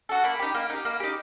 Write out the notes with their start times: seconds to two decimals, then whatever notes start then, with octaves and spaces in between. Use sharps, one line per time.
0.09 F#4 A4
0.24 A#3 B5
0.39 D#4 G4
0.55 A#3
0.70 D#4 G4
0.85 A#3
1.00 D#4 G4